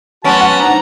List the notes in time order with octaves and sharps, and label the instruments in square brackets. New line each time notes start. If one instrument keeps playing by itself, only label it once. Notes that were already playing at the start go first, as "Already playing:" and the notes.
[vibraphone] F#3 A3 C6 [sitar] B3 C#4 [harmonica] F#4 A5
[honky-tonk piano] F#5
[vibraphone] D4 D#4 C5 [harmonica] A#5